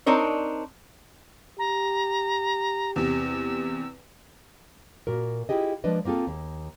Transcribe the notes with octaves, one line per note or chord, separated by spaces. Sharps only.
C4 D4 D#4 A#4 C#5
G4 A#5
E2 C3 E6
A#2 F#4 A#4
E4 F4 G4 G#4 D#5
F3 G#3 A#3 D4 B4 D#5
A#3 C4 F4 G#4 A4
D#2